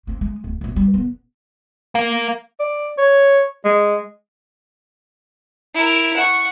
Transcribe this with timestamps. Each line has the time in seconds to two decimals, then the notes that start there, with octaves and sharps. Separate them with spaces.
0.07 A#3 C4
0.21 G#3
0.44 D1
0.61 G1 A#2
0.76 G3
0.94 D#1 B3
1.95 A#3
2.60 D5
2.98 C#5
3.65 G#3
5.74 E4 A#4
6.16 F#5 C#6